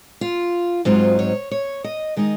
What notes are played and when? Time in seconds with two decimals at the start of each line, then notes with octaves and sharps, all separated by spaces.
0.21 F4
0.85 G#2 F#3 C4 D#4 F4
1.19 C#5
1.51 C#5
1.84 D#5
2.17 D#3 G#3 D#4 D#5